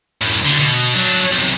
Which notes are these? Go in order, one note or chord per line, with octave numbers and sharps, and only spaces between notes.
F#2 A2
D2 D3
B2
F#3 D4
B1 C3